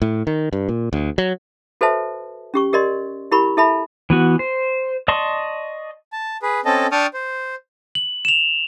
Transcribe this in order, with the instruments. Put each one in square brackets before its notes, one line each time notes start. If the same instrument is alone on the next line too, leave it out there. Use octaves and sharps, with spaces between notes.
[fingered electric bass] A2
D#3
G2
A#2
D2
F#3
[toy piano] F#4 A4 B4 C5 E5 A5
C#4 G4 C#6
G4 A#4 D5 D#5 C6
E4 G4 A#4 B5 C#6
E4 A4 E5 A5 B5
[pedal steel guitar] E3 B3 F#4
C5
D5 D#5 A5 C6 C#6
[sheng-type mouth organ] A5
G#4 B4
C4 C#4 A4 D#5 A5
D4 G5 A5 C#6 D#6 F6
C5
[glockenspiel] F#7
E7 F7